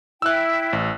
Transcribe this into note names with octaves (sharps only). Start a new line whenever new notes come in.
E4 G5 E6 F#6
A1